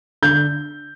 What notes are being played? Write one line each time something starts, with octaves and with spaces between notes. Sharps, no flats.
D3 G6